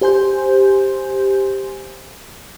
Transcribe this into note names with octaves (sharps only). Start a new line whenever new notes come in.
G4 C5 G#5 C6 G6